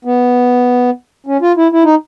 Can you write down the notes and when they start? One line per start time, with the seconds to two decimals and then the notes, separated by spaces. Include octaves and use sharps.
0.05 B3
1.27 C#4
1.42 F4
1.57 E4
1.72 E4
1.84 D#4